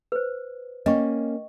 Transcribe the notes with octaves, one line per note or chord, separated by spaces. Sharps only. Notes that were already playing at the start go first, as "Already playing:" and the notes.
B4 C5
A#3 C#4 D#5 G5 C#6